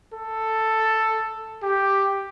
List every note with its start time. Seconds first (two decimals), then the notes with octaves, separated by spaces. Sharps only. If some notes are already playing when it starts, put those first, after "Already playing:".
0.13 A4
1.63 G4